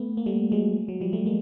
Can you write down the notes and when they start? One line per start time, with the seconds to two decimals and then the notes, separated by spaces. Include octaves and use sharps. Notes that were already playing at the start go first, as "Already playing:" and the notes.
Already playing: A3 B3
0.17 A#3
0.26 G3 A3
0.52 F#3 G#3
0.88 F#3
1.01 F3 G3
1.13 G3 A3
1.26 G#3 A#3